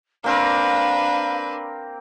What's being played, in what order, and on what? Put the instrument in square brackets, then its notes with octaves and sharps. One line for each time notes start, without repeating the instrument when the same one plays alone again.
[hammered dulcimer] A#3 C4 A#4 [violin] D4 B4 [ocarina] F5